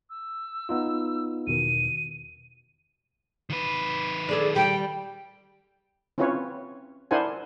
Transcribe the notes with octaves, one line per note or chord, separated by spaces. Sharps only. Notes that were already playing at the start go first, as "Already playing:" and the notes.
E6
B3 D#4 F4
E2 B2 D#3 D#7
D#3 B4
D4 G#4 A4
G3 G5
C4 C#4 E4 F4 B4 C#5
D4 E4 A#4 C5 F#5 G#5